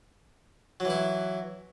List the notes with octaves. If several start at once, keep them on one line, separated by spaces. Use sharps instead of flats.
E3 F#3 E4